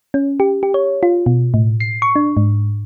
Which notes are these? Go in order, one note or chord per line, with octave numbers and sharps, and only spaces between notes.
C#4
G4
G4
C#5
F4
B2
A2
C7
C#6
D4
G#2